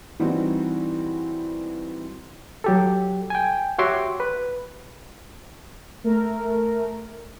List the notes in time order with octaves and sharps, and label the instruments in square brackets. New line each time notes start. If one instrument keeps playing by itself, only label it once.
[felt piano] E3 G3 C4 D#4 F#4
[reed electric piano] F#3 G4 A4
G5 G#5
F#4 G4 C#5 E5 C6 D6
B4
[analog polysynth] A3 A#4